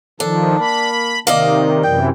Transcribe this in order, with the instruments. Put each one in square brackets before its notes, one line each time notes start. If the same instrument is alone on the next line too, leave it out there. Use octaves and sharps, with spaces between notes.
[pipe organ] D#3 F3 [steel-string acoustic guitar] D4 [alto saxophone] A4
[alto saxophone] A#3 [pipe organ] B5
[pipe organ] C3 D#3 [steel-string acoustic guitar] A#3 D5 D#5 [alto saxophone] F5
[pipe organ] F#2 C3 E3 [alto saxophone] G5